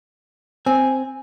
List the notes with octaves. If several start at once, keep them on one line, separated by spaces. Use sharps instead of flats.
C4 G#5